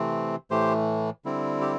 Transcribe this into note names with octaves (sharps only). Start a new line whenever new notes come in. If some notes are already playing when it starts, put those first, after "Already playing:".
Already playing: C3 E3 A3 C4
A2 E3 A3 G4 C5
D3 G3 C4 E4
G4